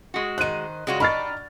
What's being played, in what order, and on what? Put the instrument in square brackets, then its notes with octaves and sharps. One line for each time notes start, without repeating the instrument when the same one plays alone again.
[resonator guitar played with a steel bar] G#3 F#4
[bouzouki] D#3 C5 [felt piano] F#6 D#7
[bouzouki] C#3 G3 F4 [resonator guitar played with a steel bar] G#3 F#4
[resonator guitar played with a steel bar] D4 [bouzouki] D#4 G4 [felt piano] B5 F6 A6